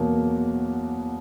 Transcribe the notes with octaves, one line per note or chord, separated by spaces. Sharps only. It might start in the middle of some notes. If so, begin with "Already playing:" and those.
Already playing: E2 B2 F#3 A#3 F#4 A#4